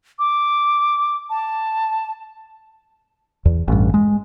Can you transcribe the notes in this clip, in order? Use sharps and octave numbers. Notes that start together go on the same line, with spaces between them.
D6
A5
E2
A1 G2
G#3